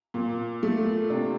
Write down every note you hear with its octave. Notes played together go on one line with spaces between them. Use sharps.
A#2
A3
C3 D4